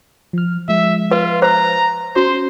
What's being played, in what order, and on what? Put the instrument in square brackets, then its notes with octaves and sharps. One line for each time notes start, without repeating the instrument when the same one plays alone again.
[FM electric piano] F3 F6
[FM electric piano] F3 G#3 [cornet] E5
[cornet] F4 [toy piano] B4
[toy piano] C5 [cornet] A#5
[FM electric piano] C#4 [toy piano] F#4 [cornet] C5